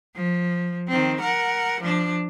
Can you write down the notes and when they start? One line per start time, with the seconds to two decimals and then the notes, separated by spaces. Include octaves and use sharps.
0.16 F3
0.88 D#3 C4
1.21 A#4 F#5
1.81 F3 D4